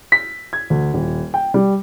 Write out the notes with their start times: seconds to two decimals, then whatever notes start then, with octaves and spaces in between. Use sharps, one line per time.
0.12 B6
0.53 G#6
0.70 D2
0.94 D#1
1.34 G5
1.54 G3